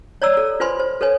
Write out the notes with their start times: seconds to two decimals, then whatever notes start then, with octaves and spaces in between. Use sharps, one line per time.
0.22 C#5 D5 A#5 E6
0.37 A4
0.60 F4 B4 C5 G#5 B5 C6
0.80 C5
1.01 A4 B4 C#5 G#5